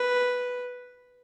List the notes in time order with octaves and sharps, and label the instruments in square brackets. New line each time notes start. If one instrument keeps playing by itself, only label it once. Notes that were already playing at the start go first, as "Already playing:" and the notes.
Already playing: [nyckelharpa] B4